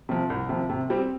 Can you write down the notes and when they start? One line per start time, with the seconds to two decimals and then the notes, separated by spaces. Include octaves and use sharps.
0.09 C3 F3
0.30 C2
0.49 C3 F3
0.70 C3
0.90 G3 C4